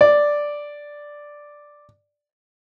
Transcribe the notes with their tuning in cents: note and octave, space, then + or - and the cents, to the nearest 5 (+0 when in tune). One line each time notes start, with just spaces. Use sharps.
D5 +0